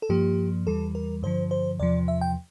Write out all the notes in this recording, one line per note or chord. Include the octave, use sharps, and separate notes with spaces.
A4
G2 F3 A#3 G4
E2 E3 G3 A4
A#4
G2 D3 F3 C5
C5
E2 C3 F3 D5
E5
G5